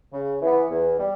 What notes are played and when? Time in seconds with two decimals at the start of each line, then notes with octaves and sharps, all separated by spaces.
0.12 C#3
0.41 E3 B3
0.70 E2
0.99 G3